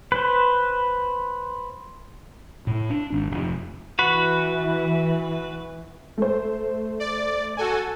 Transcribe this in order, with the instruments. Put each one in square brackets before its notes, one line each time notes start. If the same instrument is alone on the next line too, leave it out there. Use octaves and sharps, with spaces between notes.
[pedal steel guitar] B4 C5
[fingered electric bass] A2
D4
G#1
F1
[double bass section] E3 [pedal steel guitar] F#4 B4
[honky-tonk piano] A3 C5
[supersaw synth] D5
F#4 A4 G#5